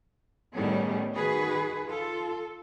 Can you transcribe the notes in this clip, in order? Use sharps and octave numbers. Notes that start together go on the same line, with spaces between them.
A2 D#3 G3 B3 C#4 G#4
D#3 F#4 G#4 B4
F4 A4